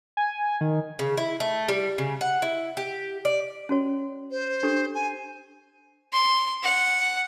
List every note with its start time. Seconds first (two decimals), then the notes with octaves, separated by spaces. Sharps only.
0.17 G#5
0.61 D#3
0.99 C#3
1.17 E4
1.40 A3
1.68 G3
1.98 C#3
2.21 F#5
2.42 E4
2.77 G4
3.25 D5
3.69 C#4 F#4 C#5
4.31 C5
4.63 D4 G4 A4
4.95 G#5
6.14 C6
6.64 F#5